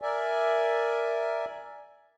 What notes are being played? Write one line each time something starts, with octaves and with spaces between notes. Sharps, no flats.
A#4 D5 E5 G#5